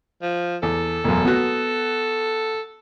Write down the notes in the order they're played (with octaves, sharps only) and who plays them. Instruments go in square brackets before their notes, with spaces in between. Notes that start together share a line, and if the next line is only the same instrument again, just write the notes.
[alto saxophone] F3
[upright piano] E2 [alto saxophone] A4
[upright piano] E1 F#2
B3 F#4